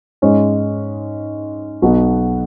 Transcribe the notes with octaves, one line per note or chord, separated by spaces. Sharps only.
G#2 G#3 C#4
B1 B2 B3 F#4